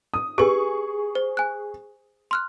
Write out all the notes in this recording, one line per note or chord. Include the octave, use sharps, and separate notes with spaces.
D#6
G4 G#4 B4 C#6
C5
G#5 F#6
C6 F6 F#6